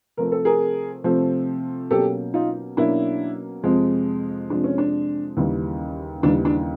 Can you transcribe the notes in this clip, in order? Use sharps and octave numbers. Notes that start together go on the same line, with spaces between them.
C3 F3 A3 C4 A#4
A4
G#4 A#4
C3 F3 A3 C4
B2 F#3 A#3 C#4 G4 A4
D#4 F4
B2 F#3 A#3 C#4 D4 E4
F2 C3 F3 G#3
F2 C3 F3 G#3 D4
C#4
D4
D#2 C#3 E3 G3
D#2 C#3 E3 G3 D4
D4